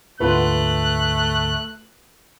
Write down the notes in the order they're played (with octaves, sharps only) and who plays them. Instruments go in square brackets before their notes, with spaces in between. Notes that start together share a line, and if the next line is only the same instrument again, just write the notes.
[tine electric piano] D2 G#2 D3 [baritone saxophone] A3 [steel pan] B3 F4 B4 [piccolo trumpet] F#6